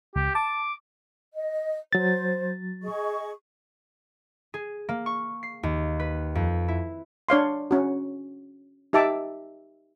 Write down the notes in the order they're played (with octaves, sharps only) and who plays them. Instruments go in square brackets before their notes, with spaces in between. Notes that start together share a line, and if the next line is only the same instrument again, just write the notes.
[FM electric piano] C#2 [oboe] G4
[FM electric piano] A5 [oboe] D6
[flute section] D#5
[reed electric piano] F#3 A6 [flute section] C5
[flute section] G#4 D#5 C#6
[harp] G#4
A#3
C#6
C7
D#2
B4
F2
E4
[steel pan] D4 C#5 F5 C6
C#4 F#4
D#4 G4 E5 A5 D6